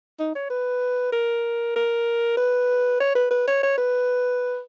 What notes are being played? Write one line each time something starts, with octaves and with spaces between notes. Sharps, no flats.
D#4
C#5
B4
A#4
A#4
B4
C#5
B4
B4
C#5
C#5
B4